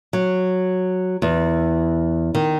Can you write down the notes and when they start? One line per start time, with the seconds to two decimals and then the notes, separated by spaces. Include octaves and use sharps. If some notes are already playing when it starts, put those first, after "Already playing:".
0.13 F#3
1.22 E2
2.35 D#3